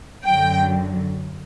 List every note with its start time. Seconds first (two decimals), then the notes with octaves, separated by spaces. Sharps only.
0.25 F#2 D3 F#3 G5